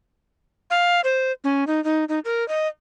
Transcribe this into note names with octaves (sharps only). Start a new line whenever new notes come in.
F5
C5
C#4
D#4
D#4
D#4
A#4
D#5